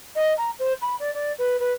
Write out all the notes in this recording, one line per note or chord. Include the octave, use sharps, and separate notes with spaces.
D#5
A#5
C5
B5
D5
D5
B4
B4